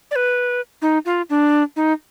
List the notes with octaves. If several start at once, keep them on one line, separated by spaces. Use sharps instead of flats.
D5
B4
D#4
F4
D4
D#4